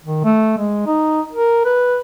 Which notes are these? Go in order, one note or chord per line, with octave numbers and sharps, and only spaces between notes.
D#3
A3
G#3
D#4
A#4
B4